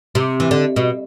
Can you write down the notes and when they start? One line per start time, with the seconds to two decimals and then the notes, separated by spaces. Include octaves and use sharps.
0.15 C3
0.40 E3
0.51 D3
0.76 B2